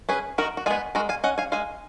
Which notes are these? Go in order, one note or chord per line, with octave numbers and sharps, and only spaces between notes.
C#4 G#4 B4
D#3 F#4 A#4
F#4
G#3 B3 F4 G#4
G#3 F#4 A#4
F5 G#5
C#4 D#5 F#5
F5 G#5
G#3 F5 G#5